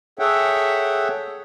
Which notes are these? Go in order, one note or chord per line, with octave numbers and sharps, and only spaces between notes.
G#4 A4 C#5 E5 F#5 G5